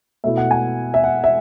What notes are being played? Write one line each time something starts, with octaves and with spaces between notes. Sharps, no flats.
B2 A3 E4 E5
F#5
G#5
E5
F#5
E5